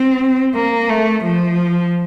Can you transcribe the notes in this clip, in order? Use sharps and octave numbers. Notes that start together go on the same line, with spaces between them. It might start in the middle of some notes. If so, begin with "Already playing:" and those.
Already playing: C4
A#3
A3
F3